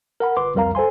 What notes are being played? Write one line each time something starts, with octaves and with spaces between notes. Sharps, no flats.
A#4 F#5 B5
G1 B4 C6 D6
C2 F2 G3 A#4 F5 A#5
A4 C5 G#5 C6